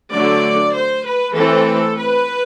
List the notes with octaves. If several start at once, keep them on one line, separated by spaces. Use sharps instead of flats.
D3 F#3 A3 D5
C5
B4
E3 A3 C4 A4
B4